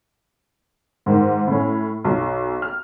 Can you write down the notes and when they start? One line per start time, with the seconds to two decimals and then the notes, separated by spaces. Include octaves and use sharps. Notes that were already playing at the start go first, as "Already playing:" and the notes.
1.06 G#2 D#3
1.48 A2 C#4
2.05 B1
2.62 F6